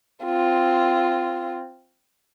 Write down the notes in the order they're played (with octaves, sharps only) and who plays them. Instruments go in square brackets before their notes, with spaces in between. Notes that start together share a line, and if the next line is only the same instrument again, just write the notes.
[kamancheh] C4 F4